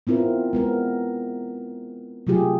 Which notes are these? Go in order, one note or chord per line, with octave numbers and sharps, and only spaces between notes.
B3 C4 E4 F4 A#4
G#3 B3 A#4
C3 F#3 A3 F4 G4 G#4